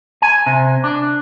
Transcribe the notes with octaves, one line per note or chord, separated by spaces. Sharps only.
G#5
C3
D4